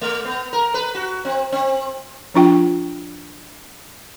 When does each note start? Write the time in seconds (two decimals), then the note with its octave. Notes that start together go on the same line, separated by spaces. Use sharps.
0.01 A3
0.25 B3
0.53 A#4
0.74 B4
0.95 F#4
1.25 C4
1.52 C4
2.34 F3 D4 F4 G5